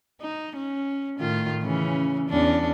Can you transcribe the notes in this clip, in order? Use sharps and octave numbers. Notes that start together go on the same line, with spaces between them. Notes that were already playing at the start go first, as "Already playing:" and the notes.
D#4
C#4
A2 D#3 F4
C#3 E3 C#4
E2 C#4 D4